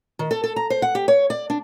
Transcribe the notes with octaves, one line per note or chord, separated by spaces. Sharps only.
D#3
A4
A4
A#5
C5
F#5
G4
C#5
D5
D4